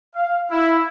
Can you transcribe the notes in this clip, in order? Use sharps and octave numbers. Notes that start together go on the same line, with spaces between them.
F5
E4